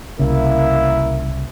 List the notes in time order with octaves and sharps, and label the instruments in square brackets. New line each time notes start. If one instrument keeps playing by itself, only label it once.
[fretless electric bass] C2 C#3 [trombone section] A#3 E4